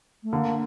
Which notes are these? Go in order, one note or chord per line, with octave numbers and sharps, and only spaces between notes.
A3
D3 A#3